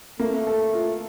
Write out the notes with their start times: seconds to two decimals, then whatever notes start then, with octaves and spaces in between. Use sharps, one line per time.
0.20 A3 A#3
0.47 A4
0.73 F4